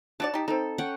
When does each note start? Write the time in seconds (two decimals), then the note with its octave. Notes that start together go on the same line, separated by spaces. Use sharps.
0.20 D4 F#4 D5 A5
0.34 D#4 G4
0.48 C4 D#4 A4
0.78 C#4 F#5 G5